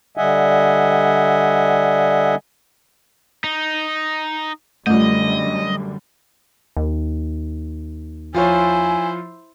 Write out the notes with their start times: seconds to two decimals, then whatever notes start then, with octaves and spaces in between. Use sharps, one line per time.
0.17 D3 G3 D#5 E5 F#5 G#5
3.44 D#4
4.87 F#2 D3 G3 A3 F4 D#5
6.77 D#2
8.34 F3 E4 F4 C5 C#5 G#5